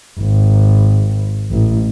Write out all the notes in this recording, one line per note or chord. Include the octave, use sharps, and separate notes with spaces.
G#1
A1